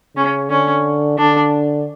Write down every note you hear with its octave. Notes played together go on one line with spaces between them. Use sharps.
C#3 C#4
D3 C#4
D3 D4